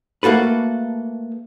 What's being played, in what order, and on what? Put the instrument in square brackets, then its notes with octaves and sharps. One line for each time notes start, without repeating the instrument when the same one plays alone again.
[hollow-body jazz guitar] A3 A#3 F#4 A4 B4